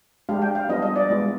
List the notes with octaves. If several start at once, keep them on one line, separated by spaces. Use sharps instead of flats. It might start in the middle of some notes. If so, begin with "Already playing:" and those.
G#3 D4 G4 F5
G5
F5
G3 B3 D4 F4 D#5
D#5
D5
G#3 B3 F4